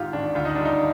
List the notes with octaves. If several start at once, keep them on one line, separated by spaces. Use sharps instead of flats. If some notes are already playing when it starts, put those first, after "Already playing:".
Already playing: G#1 G#2 F4 G4
G#1 D4
D2 F4
D#4
G3 D4
D#4